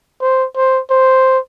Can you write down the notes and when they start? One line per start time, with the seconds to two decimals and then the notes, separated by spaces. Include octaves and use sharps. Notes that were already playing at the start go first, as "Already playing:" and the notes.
0.21 C5
0.56 C5
0.90 C5